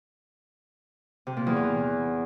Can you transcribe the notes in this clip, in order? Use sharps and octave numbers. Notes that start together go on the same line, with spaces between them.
C3
A#2
E2
E3